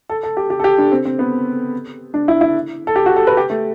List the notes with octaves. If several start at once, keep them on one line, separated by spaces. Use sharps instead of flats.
A4
A4
G4
G4
A4
G4
D4
C4
C4
B3
D4
E4
E4
A4
G4
F#4
A4
B4
G4
A3